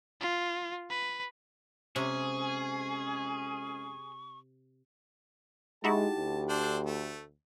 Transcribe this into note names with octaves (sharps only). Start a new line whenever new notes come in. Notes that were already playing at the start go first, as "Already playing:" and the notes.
F4
B4
F2 C3 G#3 C#4 G#4 C#6
G#3 D#4 E4 F#4 G4 A5
D2
D4 A4 C5
A3